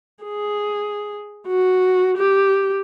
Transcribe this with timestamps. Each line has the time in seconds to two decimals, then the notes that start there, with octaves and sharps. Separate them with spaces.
0.24 G#4
1.48 F#4
2.17 G4